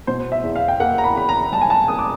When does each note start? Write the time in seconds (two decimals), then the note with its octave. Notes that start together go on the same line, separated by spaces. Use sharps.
0.07 B2 C5
0.32 E5
0.43 E2
0.55 F5
0.68 G5
0.80 A#3 F#5
0.98 A#5
1.04 B5
1.16 E2 B5
1.29 A#5
1.52 G3 A5
1.61 G#5
1.70 A5
1.88 A#3 D#6
1.99 D6